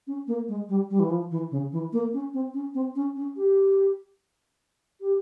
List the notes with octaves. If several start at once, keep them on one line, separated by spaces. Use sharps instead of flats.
C#4
A#3
G#3
G3
G3
E3
F3
E3
C#3
E3
A#3
C#4
C4
C#4
C4
C#4
C#4
G4
G4